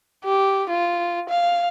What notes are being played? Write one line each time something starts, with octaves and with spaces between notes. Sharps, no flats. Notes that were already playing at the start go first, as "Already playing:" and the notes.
G4
F4
F5